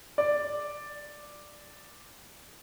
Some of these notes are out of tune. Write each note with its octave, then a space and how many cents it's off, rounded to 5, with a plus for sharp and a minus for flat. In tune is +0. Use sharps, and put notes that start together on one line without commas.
D5 +5